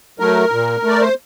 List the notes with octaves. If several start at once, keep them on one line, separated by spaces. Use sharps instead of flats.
F#3 A3 A#4
A#2
A3
D5
C5